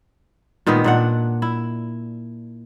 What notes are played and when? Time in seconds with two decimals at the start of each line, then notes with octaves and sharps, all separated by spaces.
0.66 A#2 D#3 G#3 B3
0.84 A#2 D4 F#5
1.42 E4